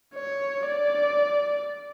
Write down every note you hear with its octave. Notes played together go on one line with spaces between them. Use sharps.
C#5
D5